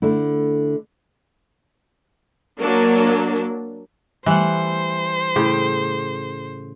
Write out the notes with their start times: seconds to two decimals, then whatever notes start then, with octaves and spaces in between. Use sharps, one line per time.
0.02 D3 A3 E4
2.58 F#3 A#3 D4
4.26 E3 G3 A3 C5 F#5
5.36 A2 C#3 G4